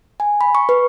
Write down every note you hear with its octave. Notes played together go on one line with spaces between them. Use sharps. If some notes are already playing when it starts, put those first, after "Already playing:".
G#5
B5
C#6
B4